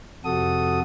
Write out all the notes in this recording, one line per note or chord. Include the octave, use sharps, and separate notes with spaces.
F2 C3 F#4 A4 D#6